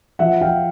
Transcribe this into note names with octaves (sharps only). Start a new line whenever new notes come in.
F3 E5 F#5
F3 F5 G5